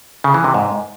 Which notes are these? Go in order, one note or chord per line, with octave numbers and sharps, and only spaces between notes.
C#3
E3
C3
G#2